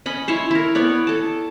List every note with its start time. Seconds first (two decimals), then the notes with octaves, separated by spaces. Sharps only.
0.06 C#4 D#5 B5
0.28 E4 C#5 E5 C6
0.51 E4 A#4
0.75 B3 C#5 D5
1.07 A4 A5